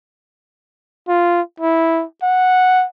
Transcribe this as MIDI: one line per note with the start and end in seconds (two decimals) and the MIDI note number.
1.08 1.41 65
1.60 2.04 64
2.23 2.85 78